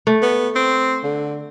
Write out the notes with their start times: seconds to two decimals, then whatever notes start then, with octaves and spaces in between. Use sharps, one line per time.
0.07 A3
0.22 B3
0.56 C4
1.04 D3